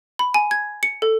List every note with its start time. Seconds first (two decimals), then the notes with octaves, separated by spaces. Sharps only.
0.19 B5
0.34 G#5
0.51 G#6
0.83 C#7
1.02 A4